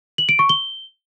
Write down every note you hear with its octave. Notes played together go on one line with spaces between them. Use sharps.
F#7
D7
C#6
G7